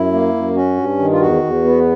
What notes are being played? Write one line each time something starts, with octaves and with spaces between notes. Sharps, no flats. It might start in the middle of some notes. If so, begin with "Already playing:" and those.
Already playing: F#2 E4
A#3
F#2
C#4 F#4
G2
D#3
F4
E2 F#4
E2
B3